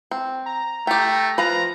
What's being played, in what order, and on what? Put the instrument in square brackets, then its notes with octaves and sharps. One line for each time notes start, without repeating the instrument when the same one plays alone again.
[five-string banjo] C4
[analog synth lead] A#5
[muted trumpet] A3 [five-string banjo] G4 G5
[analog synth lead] F3 [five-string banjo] B4 F5 [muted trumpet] A#5